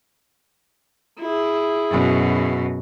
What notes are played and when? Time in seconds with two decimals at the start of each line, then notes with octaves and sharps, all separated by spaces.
1.20 E4 G#4
1.90 F#2 B2